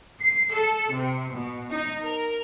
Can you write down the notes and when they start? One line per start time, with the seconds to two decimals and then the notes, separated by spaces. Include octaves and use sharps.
0.21 C7
0.53 A4
0.92 C3
1.32 B2
1.70 D#4
2.02 A#4